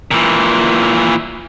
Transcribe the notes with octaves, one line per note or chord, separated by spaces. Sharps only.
A#2 E3